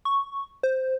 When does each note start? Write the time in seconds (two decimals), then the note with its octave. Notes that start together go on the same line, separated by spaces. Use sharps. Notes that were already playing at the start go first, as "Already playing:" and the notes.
0.05 C#6
0.63 C5